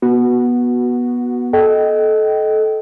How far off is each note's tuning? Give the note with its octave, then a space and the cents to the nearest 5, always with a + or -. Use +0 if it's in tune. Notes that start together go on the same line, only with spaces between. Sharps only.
B3 -20 F#4 +0
A4 -20 D#5 +0 G5 -25